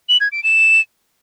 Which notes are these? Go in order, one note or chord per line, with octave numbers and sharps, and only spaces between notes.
F#7
G#6
D7
E7